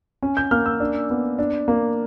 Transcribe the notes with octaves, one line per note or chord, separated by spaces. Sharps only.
C#4
G6
A#3 F6
E6
D4
B3
D4
A#3